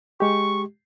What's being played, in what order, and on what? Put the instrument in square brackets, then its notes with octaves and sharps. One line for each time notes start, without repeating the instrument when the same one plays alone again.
[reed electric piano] G#3 G4 [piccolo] C#6